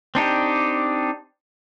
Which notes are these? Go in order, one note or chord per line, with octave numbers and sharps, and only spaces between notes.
C4 D4 D#4 G4